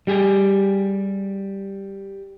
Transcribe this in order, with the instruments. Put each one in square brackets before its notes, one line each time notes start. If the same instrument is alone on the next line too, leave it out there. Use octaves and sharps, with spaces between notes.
[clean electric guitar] G3 G4 G#4